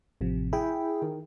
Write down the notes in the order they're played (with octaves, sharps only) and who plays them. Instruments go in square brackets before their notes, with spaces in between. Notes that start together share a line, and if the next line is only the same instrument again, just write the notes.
[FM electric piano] A1 C3 F3
[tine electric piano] E4 [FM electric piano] G#4 G5
[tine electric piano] D#3